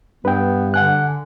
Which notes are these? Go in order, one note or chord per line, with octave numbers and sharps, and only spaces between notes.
G2 B3 B4 G5
D3 F#5 G#5 F#6